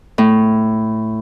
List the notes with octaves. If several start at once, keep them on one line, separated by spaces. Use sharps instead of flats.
A2